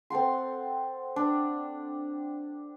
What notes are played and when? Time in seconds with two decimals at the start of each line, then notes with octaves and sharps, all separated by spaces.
0.10 C4 A4 F#5 C6
1.16 D4